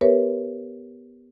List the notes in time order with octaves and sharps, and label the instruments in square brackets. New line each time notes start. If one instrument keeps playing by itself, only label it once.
[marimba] B3 G4 A#4 B4 C#5 E5